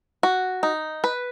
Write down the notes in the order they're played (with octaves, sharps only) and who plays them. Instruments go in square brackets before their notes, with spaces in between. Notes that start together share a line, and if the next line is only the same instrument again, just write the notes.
[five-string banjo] F#4
D#4
B4